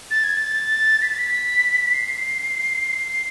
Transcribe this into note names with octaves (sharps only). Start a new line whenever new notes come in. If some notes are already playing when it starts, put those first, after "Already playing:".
A6
G#6
A6
B6
A6
B6
C7